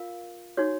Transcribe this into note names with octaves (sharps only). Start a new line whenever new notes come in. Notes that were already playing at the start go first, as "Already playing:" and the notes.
Already playing: F4 A#4 F5
D#4 F#4 C#5